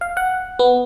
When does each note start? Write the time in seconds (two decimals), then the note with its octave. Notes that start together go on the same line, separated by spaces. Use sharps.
0.01 F5
0.17 F#5
0.59 B3